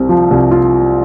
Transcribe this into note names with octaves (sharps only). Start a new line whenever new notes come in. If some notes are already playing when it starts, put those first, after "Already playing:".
Already playing: C2 C3 C4
F3
C2
F4